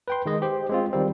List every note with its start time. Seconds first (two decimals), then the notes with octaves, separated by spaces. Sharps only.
0.08 B4 G5 C6
0.26 D#3 G#3 D#5
0.42 G4 C5
0.70 G#3 C4 F4
0.93 D#3 G3 C4